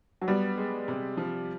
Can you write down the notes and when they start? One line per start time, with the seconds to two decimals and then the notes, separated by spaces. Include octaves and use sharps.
0.22 F#3
0.28 G3 B3
0.57 G#3
0.88 C3
1.17 F3